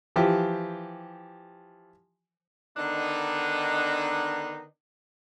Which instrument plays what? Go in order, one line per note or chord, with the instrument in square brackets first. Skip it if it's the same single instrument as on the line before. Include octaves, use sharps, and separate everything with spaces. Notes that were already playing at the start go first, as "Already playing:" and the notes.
[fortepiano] E3 F3 G4
[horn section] D3 D#3 B3 D4 D#4